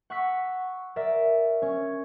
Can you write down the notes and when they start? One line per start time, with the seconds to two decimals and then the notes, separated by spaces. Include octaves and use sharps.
0.10 F#5 C#6 E6 F#6 B6
0.96 A#4 D5 E5
1.62 C#4 C#5